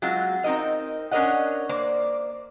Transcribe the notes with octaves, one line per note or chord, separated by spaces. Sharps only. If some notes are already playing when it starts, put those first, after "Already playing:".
F#3 G#3 C4 F4 F#4
C4 D#4 A#4 D#5
C#4 D4 A#4 C#5 D#5 F#5
A#3 C5 D5